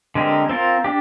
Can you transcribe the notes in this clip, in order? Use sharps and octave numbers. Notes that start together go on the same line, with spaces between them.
D3 G#3 C4 G4 A#4
C4 F4 A#4
D4 G4